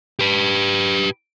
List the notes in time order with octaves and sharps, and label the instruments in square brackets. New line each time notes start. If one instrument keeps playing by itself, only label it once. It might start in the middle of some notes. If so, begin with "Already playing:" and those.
[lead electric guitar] G4 B4